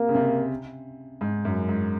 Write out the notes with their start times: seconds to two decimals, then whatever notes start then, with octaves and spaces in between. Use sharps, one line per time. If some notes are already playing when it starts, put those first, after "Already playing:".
Already playing: C3 A#3
0.09 C#3
0.15 C3
1.21 G#2
1.45 F#2
1.69 G#2